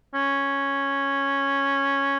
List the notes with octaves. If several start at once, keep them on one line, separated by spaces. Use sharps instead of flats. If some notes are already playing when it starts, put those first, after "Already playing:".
C#4